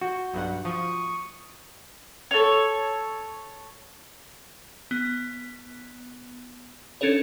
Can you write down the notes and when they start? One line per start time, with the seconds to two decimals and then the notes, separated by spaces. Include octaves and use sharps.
0.01 F#4 G6
0.34 B1 G2 F#5
0.65 F3 C#6 D#6
2.31 A4 C#5
4.91 B3
7.01 C#4 D4 A4 A#4 C#5